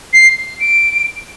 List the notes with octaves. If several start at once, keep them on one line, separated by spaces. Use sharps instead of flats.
C7
D7